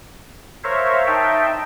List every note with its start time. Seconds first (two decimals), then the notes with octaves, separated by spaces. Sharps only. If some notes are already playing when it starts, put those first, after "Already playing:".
0.64 A#4 C5 C#5 E5 F5
1.07 D#4 E5 G5 A5